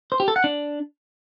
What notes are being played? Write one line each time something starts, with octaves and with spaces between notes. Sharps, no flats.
C5
G4
A4
F#5
D4